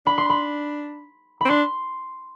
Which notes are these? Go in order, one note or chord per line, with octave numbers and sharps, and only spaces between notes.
D4 B5
C6
B5
C4 B5
D4 C6